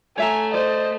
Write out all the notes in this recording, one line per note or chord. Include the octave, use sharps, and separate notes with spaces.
A3 C#5 E5 G#5 A#5
C5 D5 D#5